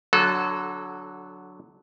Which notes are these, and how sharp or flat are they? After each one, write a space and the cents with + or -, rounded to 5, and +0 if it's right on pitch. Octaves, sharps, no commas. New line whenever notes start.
D3 +0 F#3 +0 A4 -25